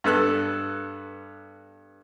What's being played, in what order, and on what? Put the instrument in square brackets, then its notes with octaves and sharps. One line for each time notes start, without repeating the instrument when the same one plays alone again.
[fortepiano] G2 B3 A4 F#6